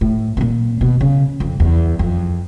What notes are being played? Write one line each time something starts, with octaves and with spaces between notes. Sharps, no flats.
A2
B2
A#2
B2
C#3
F2
E2
F2